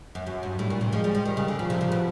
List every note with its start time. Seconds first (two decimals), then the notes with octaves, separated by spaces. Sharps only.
0.15 F#2
0.26 F#2 F#3
0.43 G2
0.59 A2 G3
0.70 A#2
0.81 C3
0.92 F3 G#3
1.04 G3
1.15 F3
1.25 D#3 G3
1.37 C#3
1.48 D3
1.59 C#3 F3
1.70 C3
1.81 C#3
1.92 B2